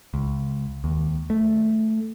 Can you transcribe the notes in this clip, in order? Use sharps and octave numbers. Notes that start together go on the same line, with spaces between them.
C#2
D#2
A3